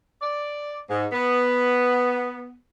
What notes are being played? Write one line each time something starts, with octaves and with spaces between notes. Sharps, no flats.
D5
G#2
B3